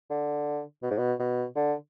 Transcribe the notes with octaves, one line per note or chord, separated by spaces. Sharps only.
D3
B2
G#2
B2
B2
D3